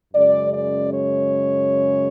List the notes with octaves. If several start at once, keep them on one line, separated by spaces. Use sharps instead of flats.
F#2 C#3 G#3 D5
D5
C#5